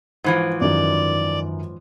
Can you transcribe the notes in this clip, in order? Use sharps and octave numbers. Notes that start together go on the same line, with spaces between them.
G#2 E3 F3 C5
F#2 D#3 D5